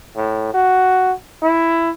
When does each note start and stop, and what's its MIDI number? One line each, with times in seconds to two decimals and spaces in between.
0.16 0.51 45
0.54 1.12 66
1.43 1.90 64